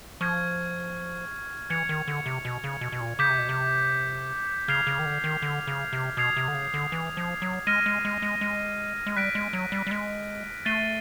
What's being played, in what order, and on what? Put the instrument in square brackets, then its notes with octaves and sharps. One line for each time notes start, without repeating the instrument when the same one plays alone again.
[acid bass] F3 [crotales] C#6 F6 G#6
[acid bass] E3 [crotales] G#6 C#7 F7
[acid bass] D#3
D3
C3
B2
C#3
B2
B2
A#2
[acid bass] C#3 [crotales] D6 G6 B6
[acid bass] C3
B2
C3
[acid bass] C#3 [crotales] F6 G#6 C7 F7
[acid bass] C#3
D#3
D3
D#3
D3
C#3
C3
[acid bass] B2 [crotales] D#6 G#6 C7 F7
[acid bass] C3
D3
C#3
D3
E3
F3
F#3
[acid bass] G#3 [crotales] F6 A#6 D#7
[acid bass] G#3
G#3
G#3
G#3
G#3
[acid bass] G3 [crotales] F#6 B6 D7
[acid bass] G#3
F#3
G3
G3
G#3
[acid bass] A3 [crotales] A6 C7 D#7 G7